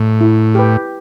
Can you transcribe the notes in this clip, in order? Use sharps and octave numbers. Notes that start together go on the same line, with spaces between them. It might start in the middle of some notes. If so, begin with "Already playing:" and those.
Already playing: A2
E4
G4 B4